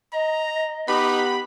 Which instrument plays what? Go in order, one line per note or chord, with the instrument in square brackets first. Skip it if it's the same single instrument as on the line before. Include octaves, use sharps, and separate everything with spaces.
[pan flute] D#5 [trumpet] A#5
[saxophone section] B3 G4 [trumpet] D#4 [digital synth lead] B5